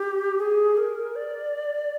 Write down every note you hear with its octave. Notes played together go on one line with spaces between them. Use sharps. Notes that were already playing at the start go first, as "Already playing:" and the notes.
Already playing: G4
G#4
A#4
D5